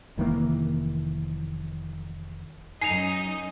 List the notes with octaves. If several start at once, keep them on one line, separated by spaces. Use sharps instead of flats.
F1 D#3 E3 A#3
F#2 D#4 D#5 G#5 C7 F7